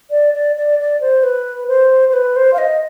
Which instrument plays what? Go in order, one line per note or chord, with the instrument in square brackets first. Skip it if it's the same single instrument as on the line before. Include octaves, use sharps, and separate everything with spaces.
[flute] D5
D5
D5
D5
C5
B4
C5
C5
B4
C5
F5
D#5